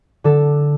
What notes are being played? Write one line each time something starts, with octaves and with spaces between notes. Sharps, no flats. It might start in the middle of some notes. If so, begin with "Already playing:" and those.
D3 A4